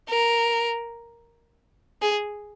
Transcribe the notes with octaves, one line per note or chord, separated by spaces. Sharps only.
A#4
G#4